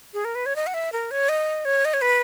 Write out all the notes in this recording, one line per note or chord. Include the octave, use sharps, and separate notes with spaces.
G#4
A#4
B4
C#5
D#5
F#5
E5
A#4
C#5
D#5
C#5
D#5
C#5
B4